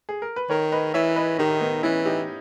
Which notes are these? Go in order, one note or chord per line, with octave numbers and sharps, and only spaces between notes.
G#4
A#4
B4
D#3 A#4 C#5
B4 D#5
E3 C#5 E5
B4 D#5
D#3 D#4 G4
B3 D#4
E3 C#4 E4
D#4 G4